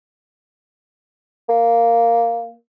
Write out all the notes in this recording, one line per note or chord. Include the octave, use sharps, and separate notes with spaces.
A#3